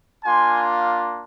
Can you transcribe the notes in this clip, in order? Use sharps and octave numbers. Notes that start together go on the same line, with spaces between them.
A#3 D4 F4 G#5 C6